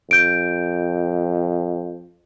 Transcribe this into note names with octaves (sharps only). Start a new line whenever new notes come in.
F2 G6 D7